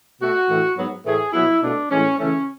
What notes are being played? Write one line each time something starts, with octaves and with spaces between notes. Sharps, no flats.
B2 A3 F#4
A2 E3 A3
G#2 F#3 B3
A2 E3 A3 G#4
B2 F#3 B3 E4
B2 A3 D4
A2 E3 G#3 C#4
C#3 E3 A3 C#4